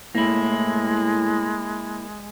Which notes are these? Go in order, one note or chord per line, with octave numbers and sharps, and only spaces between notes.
A2 G#3 A#3 E4